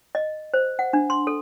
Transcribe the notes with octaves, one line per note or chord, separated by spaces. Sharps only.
D#5
C5
F#5
D4
C6
A4